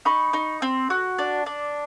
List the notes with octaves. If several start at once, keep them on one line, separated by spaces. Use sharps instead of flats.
D#4 B5 C#6
D#4
C4
F#4
D4
D4